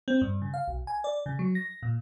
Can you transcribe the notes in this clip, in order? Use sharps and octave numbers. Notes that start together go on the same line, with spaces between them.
C4
G2
C#3
F5
B1
G#5
D5
C#3
F#3
A#6
A#2